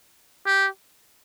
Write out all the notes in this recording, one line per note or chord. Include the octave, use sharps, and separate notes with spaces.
G4